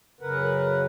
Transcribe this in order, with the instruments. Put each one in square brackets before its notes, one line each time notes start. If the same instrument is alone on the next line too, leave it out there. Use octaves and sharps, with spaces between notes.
[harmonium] F#2 C#3 A#4 B4 F#5